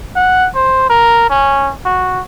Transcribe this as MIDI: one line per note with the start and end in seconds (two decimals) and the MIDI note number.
0.16 0.48 78
0.55 0.85 72
0.90 1.30 70
1.30 1.71 61
1.86 2.21 66